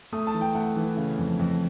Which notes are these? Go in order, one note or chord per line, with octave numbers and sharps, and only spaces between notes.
A3 D#6
A5
E3
G5
A3 F#5
E3
C#3
F2
F2